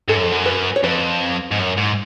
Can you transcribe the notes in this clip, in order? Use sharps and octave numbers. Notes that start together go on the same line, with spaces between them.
G#2 A4
F#2
F2
F#2
B4
C#5
F2 B4
G#2
F#2
G#2